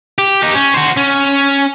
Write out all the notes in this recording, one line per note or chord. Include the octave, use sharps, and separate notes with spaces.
G4
D#4 G4
C#4
F#4 C5
C#4